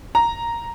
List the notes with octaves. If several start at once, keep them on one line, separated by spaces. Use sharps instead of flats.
A#5